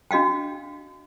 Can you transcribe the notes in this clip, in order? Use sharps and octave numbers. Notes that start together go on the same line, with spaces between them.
D4 F#4 D#5 F5 G5